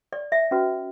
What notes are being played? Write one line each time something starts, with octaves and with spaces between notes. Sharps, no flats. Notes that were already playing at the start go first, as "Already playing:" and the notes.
D5
E5
C#4 F#4 B4